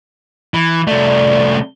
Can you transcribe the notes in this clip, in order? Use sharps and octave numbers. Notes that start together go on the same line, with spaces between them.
E3
C2 A3 D5